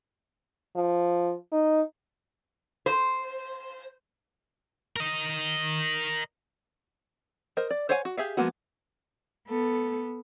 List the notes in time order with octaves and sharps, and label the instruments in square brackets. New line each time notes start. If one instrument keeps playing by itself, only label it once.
[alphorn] F3
D#4
[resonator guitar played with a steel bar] C5
[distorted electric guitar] A#4 D#5
[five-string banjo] A#4 C5 D#5
D5
C5 C#5 F5 F#5 G#5
F#4
G4 G#4 E5 F5
F3 G#3 A#3 B3 F#4
[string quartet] B3 A4